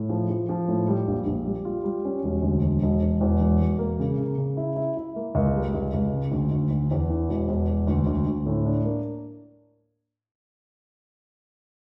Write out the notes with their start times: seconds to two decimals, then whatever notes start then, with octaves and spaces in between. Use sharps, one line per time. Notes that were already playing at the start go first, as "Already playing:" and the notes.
Already playing: A2
0.09 F3
0.30 F3
0.49 F3
0.68 A2
0.88 G3
1.07 A#1
1.27 A#1
1.46 G3
1.65 F4
1.84 G3
2.05 C#4
2.24 E1
2.43 D2
2.63 E1
2.82 E1
3.02 E1
3.21 E2
3.40 E1
3.60 E1
3.79 A#3
3.99 C#3
4.19 C#3
4.38 C#3
4.57 E4
4.76 E4
4.97 E4
5.16 A#3
5.35 C#2
5.55 G3
5.74 C#2
5.94 C#2
6.13 C#3
6.32 D2
6.51 D2
6.71 D2
6.91 E2
7.10 E3
7.29 E1
7.48 E2
7.68 E1
7.87 D2
8.07 D2
8.27 D2
8.46 A2
8.65 D4
8.85 A#3